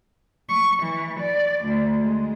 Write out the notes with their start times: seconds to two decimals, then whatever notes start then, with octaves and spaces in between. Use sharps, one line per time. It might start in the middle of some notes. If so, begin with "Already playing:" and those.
0.48 C#6
0.82 E3
1.20 D5
1.64 D2
2.02 G#3